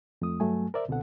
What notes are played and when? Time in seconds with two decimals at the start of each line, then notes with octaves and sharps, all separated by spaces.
0.22 F2 A3 D#6
0.40 G2 F#3 A3 G#5
0.74 A#4 C5 D5 E5
0.88 C#2 B2 D3 C4 A4 F#5